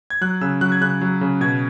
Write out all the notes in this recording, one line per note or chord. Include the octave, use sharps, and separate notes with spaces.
G#6
F#3 F#6
C#3 E6
F#3 F#6
G#6
C#3 F#6
F#3
C#3
B2 G#6